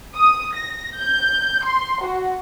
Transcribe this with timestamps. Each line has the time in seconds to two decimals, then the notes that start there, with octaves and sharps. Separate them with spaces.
0.16 D#6
0.55 A#6
0.97 G6
1.65 C6
2.04 F#4